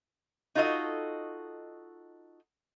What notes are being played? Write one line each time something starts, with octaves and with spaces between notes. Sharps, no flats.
D#4 F4 F#4 A4 D#5